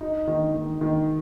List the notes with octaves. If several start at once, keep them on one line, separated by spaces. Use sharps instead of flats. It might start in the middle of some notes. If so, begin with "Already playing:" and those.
D#4
D#3
D#3
D#3